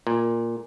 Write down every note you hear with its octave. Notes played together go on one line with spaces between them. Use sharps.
A#2